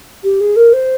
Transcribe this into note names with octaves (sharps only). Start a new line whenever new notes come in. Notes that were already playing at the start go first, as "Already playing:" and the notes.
G4
G#4
A#4
C5